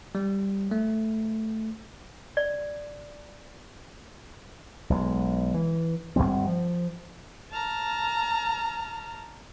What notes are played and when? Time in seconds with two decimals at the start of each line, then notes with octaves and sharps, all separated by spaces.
0.15 G3
0.71 A3
2.37 D5
4.90 B1 G#3
5.54 E3
6.16 G1 G2 G3 C4
6.47 F3
7.51 A5 A#5 F6